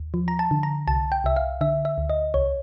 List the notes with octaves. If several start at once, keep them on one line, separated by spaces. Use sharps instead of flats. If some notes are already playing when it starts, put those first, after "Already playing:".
Already playing: D#2
F3
A#5
A5
D3
A#5
C2 A5
G5
C2 E5
F5
D3 E5
E5
D2
D#5
C2 C#5